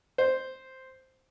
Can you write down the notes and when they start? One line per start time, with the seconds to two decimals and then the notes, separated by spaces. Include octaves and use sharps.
0.18 C5